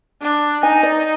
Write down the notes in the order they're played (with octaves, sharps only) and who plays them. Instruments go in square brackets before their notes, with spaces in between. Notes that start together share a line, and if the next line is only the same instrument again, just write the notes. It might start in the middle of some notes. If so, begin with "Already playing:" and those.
[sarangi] D4
[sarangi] D#4 [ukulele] G#5
[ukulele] D5